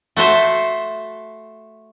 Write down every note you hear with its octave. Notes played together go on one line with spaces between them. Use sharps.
A3 F#4 C5 E5